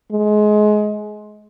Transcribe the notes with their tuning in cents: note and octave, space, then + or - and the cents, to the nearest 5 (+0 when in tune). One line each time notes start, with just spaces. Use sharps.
G#3 +25